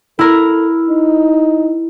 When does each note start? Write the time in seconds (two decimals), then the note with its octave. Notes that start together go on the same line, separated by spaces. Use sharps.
0.19 E4 A4 A#4
0.89 D#4